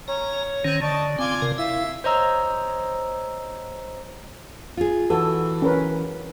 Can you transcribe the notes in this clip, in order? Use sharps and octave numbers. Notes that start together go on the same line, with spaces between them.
C#4 C#5 A#5
D#3 C4 C#4
D3 D5 D#5 A5 C#6
C4 F4 G#5 D6
C3 A#4
E4 E5 F5
C5 C#5 D#5 A#5 E6 G6
F4 G#4
E3 F#4 A4
C#4 A#4 B4